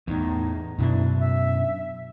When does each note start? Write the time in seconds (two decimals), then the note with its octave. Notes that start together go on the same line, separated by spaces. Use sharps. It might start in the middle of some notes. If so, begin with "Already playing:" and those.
0.08 E2 A2 D#4
0.78 F#2 B2 D4 E4
1.19 E5